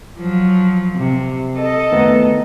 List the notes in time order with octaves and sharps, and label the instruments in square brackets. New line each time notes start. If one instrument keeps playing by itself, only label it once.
[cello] F3 F#3
C3
A4 D#5
[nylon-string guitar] D#3 A3 B3